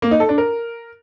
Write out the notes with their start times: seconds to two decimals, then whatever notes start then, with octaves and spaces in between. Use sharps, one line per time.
0.02 A#3
0.11 D#4
0.20 A4
0.29 D4
0.38 A#4